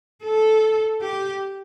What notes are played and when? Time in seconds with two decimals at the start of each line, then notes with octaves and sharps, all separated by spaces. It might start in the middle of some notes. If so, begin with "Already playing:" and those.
0.23 A4
1.01 G4